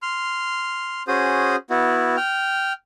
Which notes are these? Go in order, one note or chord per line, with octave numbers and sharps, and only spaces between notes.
C6 F6
C#4 F#4 G#4 C5 D#6
B3 E4 F#4
G5 F6